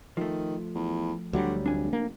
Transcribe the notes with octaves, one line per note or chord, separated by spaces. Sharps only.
D#3 F3 A3
E2
D2 D3 F#3 G3
F1 D4 G#5
A#3